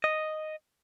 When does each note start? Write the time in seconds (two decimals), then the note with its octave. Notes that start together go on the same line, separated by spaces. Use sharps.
0.04 D#5